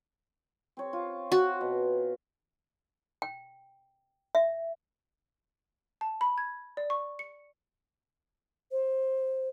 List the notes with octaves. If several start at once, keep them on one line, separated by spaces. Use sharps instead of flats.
C4 C#5
F4
F#4
B2
G5
E5
A5
B5
G#6
D5
C#6
C#7
C5